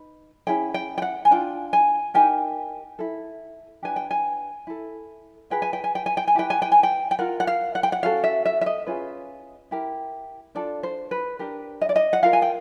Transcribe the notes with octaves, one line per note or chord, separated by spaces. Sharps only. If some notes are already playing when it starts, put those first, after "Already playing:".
Already playing: D#4 B4
C#4 E4 G#4 G5
G5
G5
F#5
G#5
D4 F4 G5
G#5
D#4 G4 A#4 G#5
E4 A4
D4 G4 B4 G#5
G5
G#5
E4 A4
F4 G#4 B4 G5
G#5
G5
G#5
G5
G#5
G5
G#5
E4 G4 B4 G5
G#5
G5
G#5
G5
G5
F4 A#4 F#5
F#5
F5
F#5
G5
F#5
C#4 F#4 A4 F5
E5
E5
E5
D#5
C#4 F4 G#4 B4
E4 G4 A#4
D4 F4 A4 D5
C5
B4
D4 G4 A#4
D#5
D5
D#5
F#5
F4 A#4 F5
G#5
G5